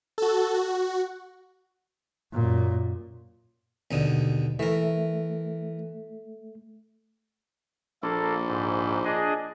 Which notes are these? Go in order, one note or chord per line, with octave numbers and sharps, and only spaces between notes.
F#4 A4
F#4
F#2 A#2
D#2 B2 D3
E3 A3 A#4
A#1 A#3 A4
G#2
D4 G#4 D#5